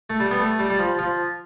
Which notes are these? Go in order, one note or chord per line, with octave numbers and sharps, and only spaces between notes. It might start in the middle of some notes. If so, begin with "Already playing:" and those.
A3
G3
B3
A3
G3
G3
F3
F3